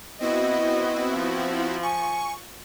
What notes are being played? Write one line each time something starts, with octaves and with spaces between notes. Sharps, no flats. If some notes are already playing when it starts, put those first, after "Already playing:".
B3 C4 E4 F#4 D#5
F3
G#5 C#6